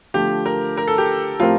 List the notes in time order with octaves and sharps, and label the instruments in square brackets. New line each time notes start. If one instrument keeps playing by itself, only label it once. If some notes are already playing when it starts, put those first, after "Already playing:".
[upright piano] D3 F3 A3 [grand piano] G4
[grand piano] A#4
A#4
A4
G4
[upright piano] A2 F3 C4 G4 A#4 [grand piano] F4